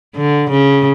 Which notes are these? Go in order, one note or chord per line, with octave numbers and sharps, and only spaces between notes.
D3
C#3